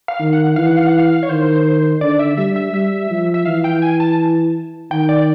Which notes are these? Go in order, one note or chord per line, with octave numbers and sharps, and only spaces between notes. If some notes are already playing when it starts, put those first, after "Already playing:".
F5
D#3
F#5
E3 F5
F#5
F5
F#5
F5
C#5
D#3 C5
D3 D5
E5
G3 E5
E5
G3 E5
F3
E5
E3 F5
G5
G#5
A5
D#3 G5
D5